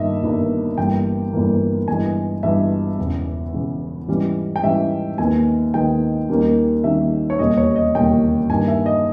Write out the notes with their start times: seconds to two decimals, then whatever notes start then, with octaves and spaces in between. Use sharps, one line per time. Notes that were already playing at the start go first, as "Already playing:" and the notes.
Already playing: G1 G2 D#3 A#3 D#5 E5
0.22 G1 G2 D#3 A#3
0.77 G1 G2 E3 A#3 G5
1.33 G1 G2 E3 A#3
1.88 G1 G2 E3 G#3 G#5
2.43 G1 G2 E3 G#3 E5
2.98 E1 E2 C#3
3.53 E1 E2 C#3
4.08 G#2 E3 G3 C#4
4.56 G5
4.63 G#2 E3 G3 C#4 E5
5.18 D#2 D#3 G#3 B3 G#5
5.74 D#2 D#3 G#3 B3 G5
6.29 D#2 D#3 G3 A#3 C#4
6.84 D#2 D#3 G3 A#3 C#4 E5
7.30 C#5
7.39 E1 D#2 C#3 G3 C#4 D#5
7.57 C#5
7.76 D#5
7.94 E1 D#2 C#3 G3 C#4 G5
8.50 G2 D#3 A#3 G#5
8.68 E5
8.86 D#5